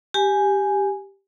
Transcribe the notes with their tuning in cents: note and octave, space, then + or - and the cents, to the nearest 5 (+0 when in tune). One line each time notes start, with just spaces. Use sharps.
G4 +0 G#5 +0